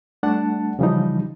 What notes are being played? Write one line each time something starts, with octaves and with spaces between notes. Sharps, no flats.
G3 A3 D4 F#5 A5
C#3 E3 F3 G3 D#4